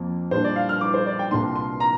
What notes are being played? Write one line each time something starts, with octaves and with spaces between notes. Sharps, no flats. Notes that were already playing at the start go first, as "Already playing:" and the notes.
Already playing: F2 F3 A#3
A#2 G3 D4 C5
D5
F5
F6
D6
C5
D5
G5
C2 A#2 A#3 D4 C6
C6
A#5